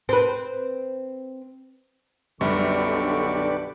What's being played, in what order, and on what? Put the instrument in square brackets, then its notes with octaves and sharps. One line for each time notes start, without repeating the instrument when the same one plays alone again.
[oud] C4 B4
[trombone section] B1 D3 [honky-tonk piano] F#2 G3 [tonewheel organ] G4 B4 D5 [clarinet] C#6